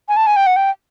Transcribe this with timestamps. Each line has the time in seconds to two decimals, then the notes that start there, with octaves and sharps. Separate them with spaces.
0.09 G#5
0.17 A5
0.27 G#5
0.36 G5
0.46 F#5
0.56 G5